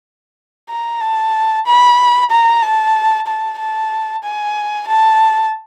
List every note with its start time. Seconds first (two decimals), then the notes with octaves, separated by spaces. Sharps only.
0.70 A#5
1.01 A5
1.66 B5
2.31 A#5
2.63 A5
3.27 A5
3.58 A5
4.23 G#5
4.88 A5